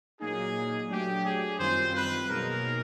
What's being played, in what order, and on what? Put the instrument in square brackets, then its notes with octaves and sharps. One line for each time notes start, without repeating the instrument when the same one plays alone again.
[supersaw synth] A#2 F#3 A#3 D#4 [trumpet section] G#4
[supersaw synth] F#3 A3 D4 [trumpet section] G4
[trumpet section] G#4
[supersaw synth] F#2 D#3 G3 C4 F4 [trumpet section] C5
[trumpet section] B4
[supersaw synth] B2 F#3 A#3 D#4 G#4 [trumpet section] A#4